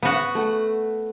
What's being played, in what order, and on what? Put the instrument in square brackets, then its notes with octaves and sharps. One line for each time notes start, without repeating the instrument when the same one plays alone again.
[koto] B3 F#4
[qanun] A3 F#5